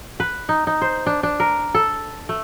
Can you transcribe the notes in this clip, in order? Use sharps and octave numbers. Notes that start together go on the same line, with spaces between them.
B4
D#4
D#4
C5
D4
D4
A#4
A4
A3